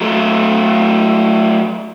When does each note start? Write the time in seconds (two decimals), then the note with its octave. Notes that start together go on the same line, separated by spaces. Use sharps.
0.01 F#3 A3